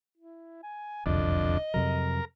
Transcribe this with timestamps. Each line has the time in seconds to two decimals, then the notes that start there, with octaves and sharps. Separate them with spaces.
0.18 E4
0.63 G#5
1.06 E1 C2 F2 D3 D4 D#5
1.74 F2 C3 F#3 A#4